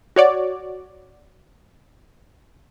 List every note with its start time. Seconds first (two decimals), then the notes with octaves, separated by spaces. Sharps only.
0.16 F#4 C#5 D5